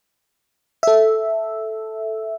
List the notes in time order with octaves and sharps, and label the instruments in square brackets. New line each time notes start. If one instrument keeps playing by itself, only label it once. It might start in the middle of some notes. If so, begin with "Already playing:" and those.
[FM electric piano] A4 E5